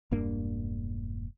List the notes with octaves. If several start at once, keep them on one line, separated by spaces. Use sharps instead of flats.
E1 G2 A#3 D4